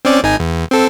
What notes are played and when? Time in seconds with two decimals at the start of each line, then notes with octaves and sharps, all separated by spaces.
0.05 C4 C#4 D5
0.23 G#1 D#4 G#5
0.40 E2
0.71 C4 A4